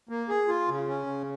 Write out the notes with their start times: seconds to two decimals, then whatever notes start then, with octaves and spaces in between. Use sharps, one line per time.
0.09 A#3
0.29 G#4
0.48 F4
0.68 C#3
0.87 C#4
1.07 C#3